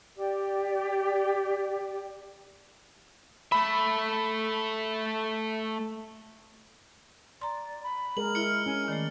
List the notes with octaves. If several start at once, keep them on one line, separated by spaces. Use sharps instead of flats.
G4 D5
A3 E5 B5
D5 A#5 C6
B5
G#3 G#4 A#4 F#7
E4 F6 C#7
C#4 G#5
D#3 A3 D5